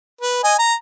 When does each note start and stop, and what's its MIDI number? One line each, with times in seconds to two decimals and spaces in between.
0.21 0.39 71
0.44 0.54 75
0.44 0.54 80
0.59 0.74 82